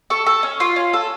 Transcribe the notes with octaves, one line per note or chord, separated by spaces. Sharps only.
A4 C#6
A4
C#4
F4
C#4
A4